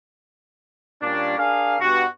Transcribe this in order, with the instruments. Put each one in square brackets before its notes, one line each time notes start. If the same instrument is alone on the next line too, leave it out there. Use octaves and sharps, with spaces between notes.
[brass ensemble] A#2 G3 A#3 C#4 D4
D4 G#4 A#4 F5
G2 G3 B3 F#4